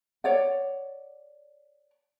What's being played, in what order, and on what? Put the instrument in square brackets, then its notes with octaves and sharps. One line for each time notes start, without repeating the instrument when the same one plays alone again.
[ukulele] C#5 D5 F#5